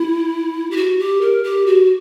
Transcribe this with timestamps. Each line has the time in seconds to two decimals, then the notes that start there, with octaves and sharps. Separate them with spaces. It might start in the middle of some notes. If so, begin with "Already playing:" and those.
Already playing: E4
0.71 G4
0.77 F#4
0.99 G4
1.21 A#4
1.44 G4
1.66 F#4